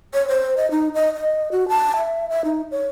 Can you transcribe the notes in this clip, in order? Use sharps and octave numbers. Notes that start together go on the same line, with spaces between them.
C#5
C5
D#5
D#4
D#5
D#5
F#4
A5
E5
E5
D#4
C#5